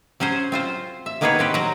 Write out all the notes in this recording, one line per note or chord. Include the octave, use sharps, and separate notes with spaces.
F#3 C#4 G#4 C5
C4 F4 C5
E5
D#3 A#3 B3 G#4 B4 C#5
C4 G4 B4
F#3 A#5